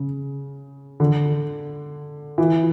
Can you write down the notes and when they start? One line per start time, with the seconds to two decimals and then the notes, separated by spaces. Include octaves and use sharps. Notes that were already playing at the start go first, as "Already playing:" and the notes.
Already playing: C#3
1.00 D3
2.38 E3